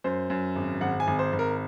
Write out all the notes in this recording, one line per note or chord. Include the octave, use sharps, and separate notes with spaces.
F#2 C5
F#2
G#1
G#1 F#5
G#5
G#1
C5
G#1
A#4